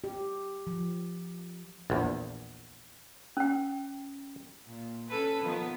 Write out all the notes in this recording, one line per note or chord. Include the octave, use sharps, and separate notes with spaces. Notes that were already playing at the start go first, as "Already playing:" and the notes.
G4
F3
A#1 E2
C#4 G5
A#2
C#4 A4 B4
D#3 F3 B3